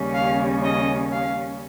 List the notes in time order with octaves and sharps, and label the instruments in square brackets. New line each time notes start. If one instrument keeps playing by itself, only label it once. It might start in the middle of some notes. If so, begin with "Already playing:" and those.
Already playing: [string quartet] D#2 C#3 G3 C#4
F5
D#5
F5